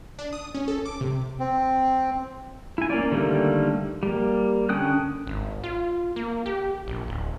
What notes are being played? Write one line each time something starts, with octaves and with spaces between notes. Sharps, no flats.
D4
D#6
C#4
A4
D6
C3
C4
E4 G#5
A#3 C#4 D5
D3 D#3 G3 A3 A#3
G3 A#3
D3 C#4 G5 D#6 F#6
G#1
F4
A#3
G4
A#1
D1